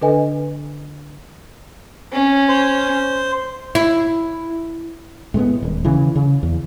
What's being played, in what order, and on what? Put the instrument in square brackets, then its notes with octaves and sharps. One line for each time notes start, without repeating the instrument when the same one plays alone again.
[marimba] D3 D4 A4 B4 D#5 G#5
[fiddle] C#4
[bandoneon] C5
[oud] E4
[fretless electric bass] A2 G#3 A3 B3
D#1
C#3 E3
C#3
E2